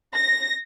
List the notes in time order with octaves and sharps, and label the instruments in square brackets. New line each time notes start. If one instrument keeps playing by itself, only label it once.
[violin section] A#6